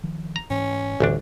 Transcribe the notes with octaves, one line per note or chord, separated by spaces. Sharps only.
D#3 F3
A#5
G#2 E3 C#4
A1 D2 D3 D#3 G3 D4